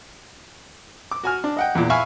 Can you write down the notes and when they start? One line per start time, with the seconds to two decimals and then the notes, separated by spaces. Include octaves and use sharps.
1.11 D6
1.24 F#4 G#5 F6
1.44 D4
1.57 D#5 F#5 G5
1.75 E2 A#2
1.90 E5 F5 G#5 B5 C#6 E6